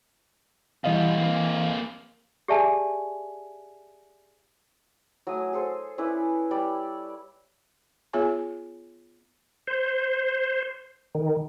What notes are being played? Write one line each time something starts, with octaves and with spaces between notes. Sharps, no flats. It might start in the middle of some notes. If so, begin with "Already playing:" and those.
B2 E3 G3 D#5 F5
A#3 C4
G4 G#4 D5 E5 G#5 A5
F#3 A3 G#5 D#6
G#4 A4 C5
C#4 E4 B4 D5
G3 C#5 D5
B3 F4 G#4 C#5 E5 G#5
C5
D#3